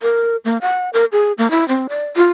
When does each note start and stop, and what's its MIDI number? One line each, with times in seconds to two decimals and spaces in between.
0.02 0.37 70
0.45 0.58 58
0.61 0.90 78
0.93 1.05 70
1.12 1.32 68
1.38 1.50 58
1.51 1.67 64
1.68 1.87 60
1.89 2.05 74
2.16 2.29 65